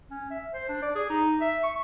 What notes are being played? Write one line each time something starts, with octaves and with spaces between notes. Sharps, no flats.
C#4
E5
C5
D4
D5
G#4
D#4
E5
C#6